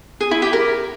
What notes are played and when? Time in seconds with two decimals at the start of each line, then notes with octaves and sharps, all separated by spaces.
0.21 G#4
0.31 E4
0.42 G4
0.53 A#4